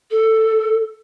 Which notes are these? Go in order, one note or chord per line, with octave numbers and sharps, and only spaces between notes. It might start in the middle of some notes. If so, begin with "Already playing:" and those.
A4